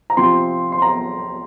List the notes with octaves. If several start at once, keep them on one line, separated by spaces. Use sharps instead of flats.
A#5
C3 F3 C4 C6
C6
A#5